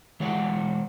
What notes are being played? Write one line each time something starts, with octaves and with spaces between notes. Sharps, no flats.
E3 G#3 C#5 D5 F#5